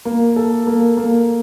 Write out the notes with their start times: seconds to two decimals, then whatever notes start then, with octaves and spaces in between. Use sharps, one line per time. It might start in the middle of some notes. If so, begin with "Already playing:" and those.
0.05 A#3
0.36 A4
0.67 A#3
0.97 A#3